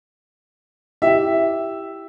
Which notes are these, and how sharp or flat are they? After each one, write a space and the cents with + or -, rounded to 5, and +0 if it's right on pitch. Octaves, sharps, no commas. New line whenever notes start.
E4 +0 G4 +0 E5 +0